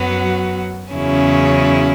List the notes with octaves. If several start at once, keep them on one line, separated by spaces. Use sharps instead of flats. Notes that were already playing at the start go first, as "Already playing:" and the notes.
Already playing: F#2 F#3 B3 F#4
E2 C#3 F#3 C#4 E4